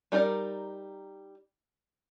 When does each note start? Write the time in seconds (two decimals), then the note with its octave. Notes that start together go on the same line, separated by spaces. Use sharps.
0.12 G3 D#4 A#4 D5